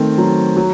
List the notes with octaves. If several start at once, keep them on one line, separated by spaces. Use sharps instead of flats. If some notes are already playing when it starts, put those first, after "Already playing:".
Already playing: D#3 A3 C4
F#3
F#3